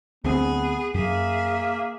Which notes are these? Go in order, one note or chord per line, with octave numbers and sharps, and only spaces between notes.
D2 B3 C4 G#4
F#2 A#3 G#4 E5